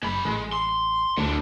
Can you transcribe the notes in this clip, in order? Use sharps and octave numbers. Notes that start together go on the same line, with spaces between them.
F#1 G#3 B5
A1 G#3
C6
D2 A2 D4